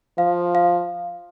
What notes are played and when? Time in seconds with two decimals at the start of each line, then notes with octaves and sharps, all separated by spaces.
0.18 F3 F5
0.55 F5